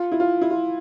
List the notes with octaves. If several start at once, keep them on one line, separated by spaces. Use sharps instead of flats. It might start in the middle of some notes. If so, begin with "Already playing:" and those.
Already playing: F4
E4
F4
E4
F4